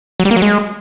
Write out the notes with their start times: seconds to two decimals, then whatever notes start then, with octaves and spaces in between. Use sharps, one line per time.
0.20 F#3
0.25 G3
0.31 A#3
0.36 F#3
0.42 G#3